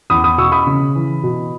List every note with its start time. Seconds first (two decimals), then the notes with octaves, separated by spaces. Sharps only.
0.10 E2 B5 D#6
0.24 B5 D#6
0.38 B2 C#6 E6
0.52 B5 D#6
0.67 C#3
0.95 E3
1.23 B2